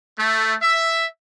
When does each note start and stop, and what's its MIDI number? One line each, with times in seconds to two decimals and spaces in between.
0.19 0.56 57
0.63 1.06 76